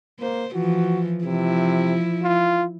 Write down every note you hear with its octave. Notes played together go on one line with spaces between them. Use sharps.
A#3 C5
E3 F3 F#4
C3 F3 E4
F4